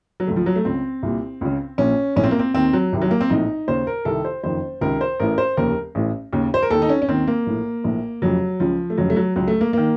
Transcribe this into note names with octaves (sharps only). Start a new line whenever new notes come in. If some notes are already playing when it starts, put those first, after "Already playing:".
F#3
C#2 C#3 A3
F3
F#3
A3
C#2 C#3 C4
C2 A#2
C#2 C#3
A#1 A#2 C#4
A#1 A2 C#4
C4
A#3
C4
D#2 D#3 C4
F#3
C2 C3 D#3
F#3
A#3
C4
A#1 A2 D#4
D#2 C#3 C5
A#4
C2 C3 D#3 A4
C5
F#1 F2 D#3 C5
C#2 C3 D#3 A#4
C5
A1 A2 A#4
C5
F1 D#2 C#3 A#4
A1 A2
D#2 C#3
C5
A#4
D#2 D#3 A4
D#4
C#4
C#4
D#2 D#3 C4
A#3
A#1 A2
A#1 A2
F1 F2 C#3 F#3
C#2 C#3 F3
A3
F1 F2 C#3 F#3
A3
F#3
C#2 C#3 F#3
A3
A#3
D#3 A#3